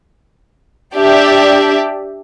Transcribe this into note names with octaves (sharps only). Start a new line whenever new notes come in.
D4 G4 D5 E5